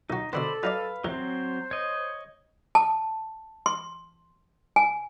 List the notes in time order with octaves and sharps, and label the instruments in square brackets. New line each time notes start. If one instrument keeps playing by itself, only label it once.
[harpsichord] B1 F#4 [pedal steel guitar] D#4
[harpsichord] B2 D3 B3 [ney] A4 [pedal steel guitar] C5 D5 B5
[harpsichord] F#3 D#4 D5 [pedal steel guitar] B4 F5
[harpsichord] A1 [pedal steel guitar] F#3 C4 [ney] C5
[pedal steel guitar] C#5 D#5
[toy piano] A5
C6
G#5